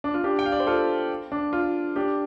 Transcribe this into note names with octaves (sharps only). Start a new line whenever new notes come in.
D4
F4
D4 G4
G5
F5
D5
C5
F4 A4
D4
F4
D4 G4